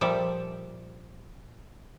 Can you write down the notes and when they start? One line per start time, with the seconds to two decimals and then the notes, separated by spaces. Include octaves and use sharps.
0.01 A#2 F3 G3 A4 D5 E5